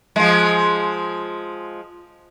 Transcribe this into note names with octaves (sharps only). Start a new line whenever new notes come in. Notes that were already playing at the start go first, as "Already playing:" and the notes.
F3 G#3